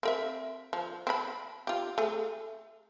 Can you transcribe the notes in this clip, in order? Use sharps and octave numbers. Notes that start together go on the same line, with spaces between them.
C4 A#4 E5
F3
C4 B5
F4 G4
A3 G#4